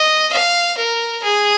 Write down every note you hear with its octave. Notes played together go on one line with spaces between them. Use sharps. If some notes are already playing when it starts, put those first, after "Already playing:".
Already playing: D#5
F5
A#4
G#4